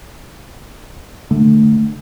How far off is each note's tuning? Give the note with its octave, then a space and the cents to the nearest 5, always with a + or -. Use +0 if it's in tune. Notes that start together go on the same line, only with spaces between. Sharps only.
D3 +25 A3 +0